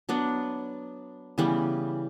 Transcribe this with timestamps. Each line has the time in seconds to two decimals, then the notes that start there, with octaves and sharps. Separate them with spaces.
0.09 F#3 B3 D4
1.38 C#3 E3 G3 B3